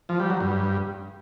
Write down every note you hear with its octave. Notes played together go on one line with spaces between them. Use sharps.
F3
G3
F#3
G2